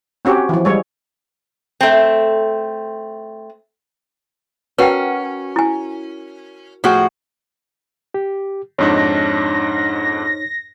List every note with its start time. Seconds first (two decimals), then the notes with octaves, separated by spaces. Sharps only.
0.25 C4 C#4 F#4 G4
0.49 E3 F3
0.65 G3 G#3 C#5
1.81 A3 C4
4.78 C#4 F#4 A#4 B4 F#5 G5
5.56 E4 G#5
6.84 A2 F3 F#4 G#4 G5
8.14 G4
8.79 F2 G#2 D4 D#4 C#5 A#6